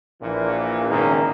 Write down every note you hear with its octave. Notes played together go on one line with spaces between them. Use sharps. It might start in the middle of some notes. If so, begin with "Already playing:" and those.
A#1 A#2 E3
G#1 E2 C#3 A#3 D#4 A#4